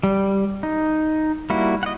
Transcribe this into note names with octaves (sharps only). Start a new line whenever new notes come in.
G3
D#4
G3 A#3 E4 F#4
D#5 F#5